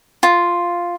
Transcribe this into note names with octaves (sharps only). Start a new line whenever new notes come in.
F4